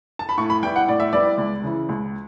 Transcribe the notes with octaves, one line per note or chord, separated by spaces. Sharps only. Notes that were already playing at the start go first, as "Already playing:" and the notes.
A5
B5
A2 C#6
B5
G3 B3 E4 G5
F#5
A2 D5
E5
G3 B3 E4 D5
C#2
C#3 E3
C#2